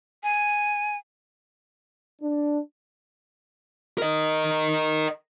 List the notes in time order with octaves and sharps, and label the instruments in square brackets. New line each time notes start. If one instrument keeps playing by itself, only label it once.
[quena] G#5
[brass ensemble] D4
[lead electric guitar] A#4 D#5